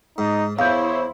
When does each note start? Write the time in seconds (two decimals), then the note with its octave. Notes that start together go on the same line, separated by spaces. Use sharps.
0.18 G#2 D#4
0.59 E2 E4 C5 C#5 F5 G6